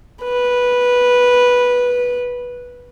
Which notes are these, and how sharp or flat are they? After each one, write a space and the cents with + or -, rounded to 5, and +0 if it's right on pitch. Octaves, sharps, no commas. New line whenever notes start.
B4 -10